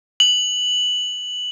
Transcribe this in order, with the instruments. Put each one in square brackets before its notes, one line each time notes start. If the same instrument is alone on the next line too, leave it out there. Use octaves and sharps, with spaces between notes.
[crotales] F#7